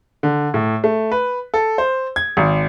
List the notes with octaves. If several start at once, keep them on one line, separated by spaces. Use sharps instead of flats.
D3
A2
A3
B4
A4
C5
G#6
G#1